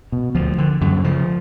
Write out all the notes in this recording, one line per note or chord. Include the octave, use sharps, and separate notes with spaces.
B2
D2 F3
D3
F#2 D3
C#3 F3